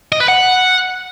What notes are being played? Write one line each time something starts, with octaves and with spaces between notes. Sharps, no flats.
D#5
B4
F#5